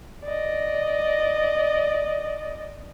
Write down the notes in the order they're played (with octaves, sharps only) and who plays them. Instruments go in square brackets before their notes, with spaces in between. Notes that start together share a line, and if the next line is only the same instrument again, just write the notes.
[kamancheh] D5 D#5